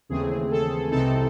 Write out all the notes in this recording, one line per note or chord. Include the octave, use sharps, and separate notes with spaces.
D#2 C#3 E3 A3 C4 G#4
A4
C2 C3 E3 C4 D#4 A4